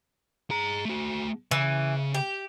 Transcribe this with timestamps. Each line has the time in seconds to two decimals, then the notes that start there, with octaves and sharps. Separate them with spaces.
0.50 G#4 A#5
0.85 A3 F#4
1.51 C#3 E3
2.15 G4